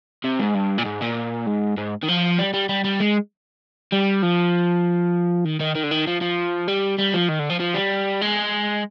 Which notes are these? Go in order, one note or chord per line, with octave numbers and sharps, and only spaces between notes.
C3
G#2
G2
A#2
G#2
A#2
G#2
G#2
D#3
F3
G3
G3
G3
G3
G#3
G3
F3
D#3
D#3
D#3
D3
D#3
F3
F3
G3
G3
F3
D#3
D3
F3
F3
G3
G#3